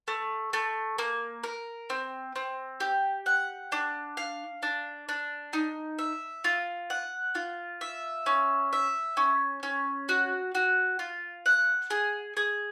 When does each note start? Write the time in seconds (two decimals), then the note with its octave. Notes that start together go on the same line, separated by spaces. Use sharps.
0.08 A3
0.53 A3
0.98 A#3
1.43 A#4
1.90 C4
2.36 C4
2.80 G4
3.26 F#5
3.72 D4
4.17 F5
4.63 D4
5.09 D4
5.53 D#4
5.99 E5
6.44 F4
6.90 F#5
7.35 F4
7.81 E5
8.26 C#4
8.73 E5
9.17 C#4
9.63 C#4
10.09 F#4
10.55 F#4
10.99 F4
11.46 F#5
11.90 G#4
12.37 G#4